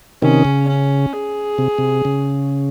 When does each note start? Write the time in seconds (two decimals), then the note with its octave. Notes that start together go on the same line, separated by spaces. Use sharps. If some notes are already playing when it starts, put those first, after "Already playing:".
0.22 C3 D#3 C#4
0.45 C#3
0.68 C#4
1.13 G#4
1.58 C3
1.78 C3
2.05 C#3